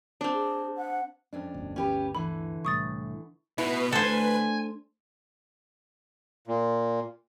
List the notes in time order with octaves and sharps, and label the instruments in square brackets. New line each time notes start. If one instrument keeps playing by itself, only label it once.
[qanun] C4 D4
[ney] G#4
F#5
[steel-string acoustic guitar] F2 C#4 D4
[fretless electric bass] G1 D2
[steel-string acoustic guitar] C#4 G4 B4
[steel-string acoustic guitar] D3 E3 [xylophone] B5
[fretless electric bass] C2 A2 [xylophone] C#6 D#6 A6
[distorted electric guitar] B2 [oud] E4 [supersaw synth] B4
[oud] D2 [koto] A4 C5 [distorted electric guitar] G#5
[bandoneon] A#2